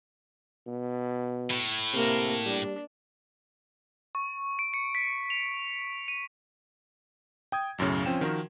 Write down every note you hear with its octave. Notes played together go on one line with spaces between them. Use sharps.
B2
A2
C3 A#3 A#4
G3 D4
C#6
D7
C#7
B6
F7
D#7
G5 D#6 G#6
B1 F#2 A2 C#3
F3 C4 C#4 G5 E7
D#3 F3 F#4 A#4